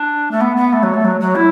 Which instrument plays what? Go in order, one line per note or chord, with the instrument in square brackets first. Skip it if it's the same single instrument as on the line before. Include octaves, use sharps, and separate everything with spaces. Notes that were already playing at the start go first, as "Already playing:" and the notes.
Already playing: [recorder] D4
A3
B3
B3
A3
F#3
A3
F#3
F#3
E4